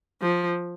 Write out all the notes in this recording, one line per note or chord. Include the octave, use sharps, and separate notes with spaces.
F3